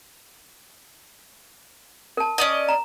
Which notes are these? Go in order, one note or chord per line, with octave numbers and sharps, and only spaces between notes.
A#4 A5
C#4 D5 D#5
A#5